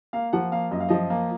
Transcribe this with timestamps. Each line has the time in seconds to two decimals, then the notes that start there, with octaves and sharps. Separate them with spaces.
0.13 A#3 F5
0.33 F3 F#5
0.52 A#3 F5
0.71 F#2 D#5
0.80 F5
0.89 F3 D#5
1.10 A#3